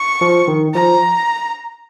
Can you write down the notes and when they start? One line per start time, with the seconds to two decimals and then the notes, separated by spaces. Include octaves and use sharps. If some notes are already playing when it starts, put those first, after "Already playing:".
Already playing: C#6
0.21 F3
0.48 D#3
0.75 F3 A#5